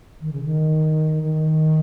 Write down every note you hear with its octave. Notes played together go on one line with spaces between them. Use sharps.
D#3
C#3
D#3
D#3